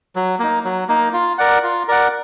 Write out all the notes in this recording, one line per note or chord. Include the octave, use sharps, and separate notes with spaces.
F#3
A#3 D#4
F#3
A#3 D#4
F4
A#4 D5 F#5
F4
A#4 D5 F#5